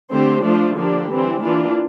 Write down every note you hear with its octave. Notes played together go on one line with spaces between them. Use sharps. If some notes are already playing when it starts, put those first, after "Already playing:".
D3 A3 C4 G4 C5
F3 A3 D4 F4 C5
D3 F3 A#3 D4 G4
E3 G3 C4
E3 A#3 D4 F4